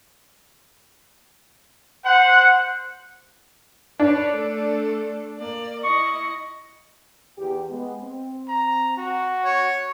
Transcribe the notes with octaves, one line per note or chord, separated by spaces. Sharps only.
C5 F#5
D4 B4 C#5
A3 A4
A#3 D5
E4 D#5 C#6
E2 G4
G#3 B3
C4
A#5
F#4
C#5